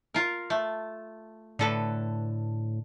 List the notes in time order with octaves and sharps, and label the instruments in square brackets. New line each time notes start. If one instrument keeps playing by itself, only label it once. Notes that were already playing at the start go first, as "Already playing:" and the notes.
[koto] F4 A#4
A3
[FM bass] A2 [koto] D3 A4 B4